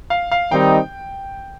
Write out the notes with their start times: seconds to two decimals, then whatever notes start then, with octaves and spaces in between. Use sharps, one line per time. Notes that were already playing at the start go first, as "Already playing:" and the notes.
0.10 F5
0.32 F5
0.51 D#3 G3 C4 D#4 G5